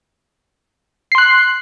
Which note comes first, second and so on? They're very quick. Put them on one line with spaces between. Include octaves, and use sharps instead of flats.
C7 C6 F#6